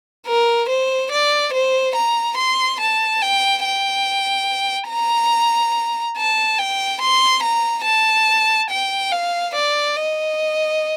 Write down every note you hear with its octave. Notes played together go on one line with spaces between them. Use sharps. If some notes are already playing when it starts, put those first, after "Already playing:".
A#4
C5
D5
C5
A#5
C6
A5
G5
G5
A#5
A5
G5
C6
A#5
A5
G5
F5
D5
D#5